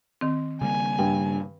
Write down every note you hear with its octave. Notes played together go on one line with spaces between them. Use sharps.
D#3 C4
C#3 G3 A#3 G#5
G2 G5